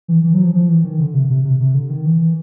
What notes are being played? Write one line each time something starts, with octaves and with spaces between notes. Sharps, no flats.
E3
E3
F#3
F3
F3
E3
D#3
D3
C3
C3
C3
C3
D3
D#3
E3